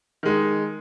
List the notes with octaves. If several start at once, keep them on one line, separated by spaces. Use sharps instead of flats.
D#3 G#3 D#4